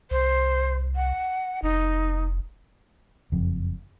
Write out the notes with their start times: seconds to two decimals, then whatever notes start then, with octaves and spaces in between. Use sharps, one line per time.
0.11 C2 C5
0.95 F#5
1.63 F1 D#4
3.32 F#1 F2